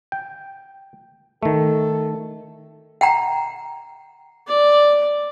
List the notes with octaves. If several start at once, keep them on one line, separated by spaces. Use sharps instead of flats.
G5
D#3 A3 A4
F#5 G5 A#5
D5